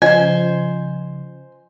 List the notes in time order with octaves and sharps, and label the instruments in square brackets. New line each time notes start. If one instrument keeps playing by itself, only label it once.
[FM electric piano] C#3 F3 [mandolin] C5 G#5 [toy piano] D#5